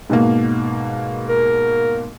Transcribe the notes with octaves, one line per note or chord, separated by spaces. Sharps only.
G#2 B2 A#3
A#4